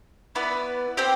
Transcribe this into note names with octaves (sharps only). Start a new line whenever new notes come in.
B3 E4 B4 D5
C4 G4 C5 G5